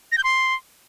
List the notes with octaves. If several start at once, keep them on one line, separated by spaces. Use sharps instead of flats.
A#6
G6
C6